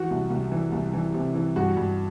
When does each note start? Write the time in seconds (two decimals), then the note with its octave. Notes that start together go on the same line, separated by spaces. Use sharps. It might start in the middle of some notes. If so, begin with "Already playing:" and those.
Already playing: E3 F#4
0.10 C2
0.30 C2
0.52 E3
0.72 C2
0.93 E3
1.14 C3
1.35 E3
1.56 G2 F#4
1.77 G2